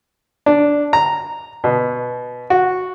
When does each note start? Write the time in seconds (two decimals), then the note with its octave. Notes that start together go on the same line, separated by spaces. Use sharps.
0.46 D4
0.93 A#5
1.64 B2
2.50 F#4